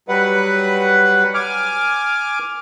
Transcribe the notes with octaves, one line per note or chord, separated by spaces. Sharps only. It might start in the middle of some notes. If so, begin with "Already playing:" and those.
F#3 G3 B4 F#5
G#5 D6 F6